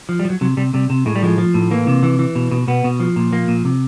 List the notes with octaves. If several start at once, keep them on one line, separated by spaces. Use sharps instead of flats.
F3
G3
F3
F#3
C3 F#3
C3 G3
C3 G3
C3
A2 G#3
G3
F3 G#3
F3
A2
E3 A#3
C3
E3
E3
B2
B2
B2 B3
B2
F3
A#2
F3 A#3
A#2
C3